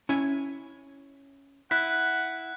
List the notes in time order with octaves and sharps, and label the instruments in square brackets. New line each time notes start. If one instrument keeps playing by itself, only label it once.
[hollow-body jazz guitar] C#4 E4 G#5
[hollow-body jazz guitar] E4 [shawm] F#5 [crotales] F#6 B6